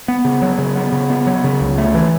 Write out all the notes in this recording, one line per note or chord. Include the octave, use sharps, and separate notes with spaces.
B3
C#3
F#3
C#3
B3
C#3
B3
F#3
C#3
C#2
A3
E3